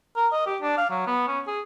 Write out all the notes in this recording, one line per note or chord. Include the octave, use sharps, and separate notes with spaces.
A#4
D#5
G4
D4
F5
F#3
B3
C#4
G#4